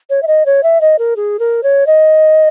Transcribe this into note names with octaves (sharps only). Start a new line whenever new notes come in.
C#5
E5
D#5
C#5
E5
D#5
A#4
G#4
A#4
C#5
D#5